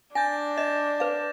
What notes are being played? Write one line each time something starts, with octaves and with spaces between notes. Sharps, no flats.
D4 G#5 G6 A6 A#6
D#5 E7
B4 F5